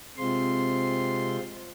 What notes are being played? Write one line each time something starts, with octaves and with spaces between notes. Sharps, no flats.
C3 G#3 C4 F4 C6